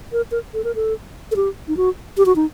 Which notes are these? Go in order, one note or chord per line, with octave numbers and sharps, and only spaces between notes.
A#4
A#4
A4
A#4
A4
A4
G4
D#4
F#4
G4
F#4
D#4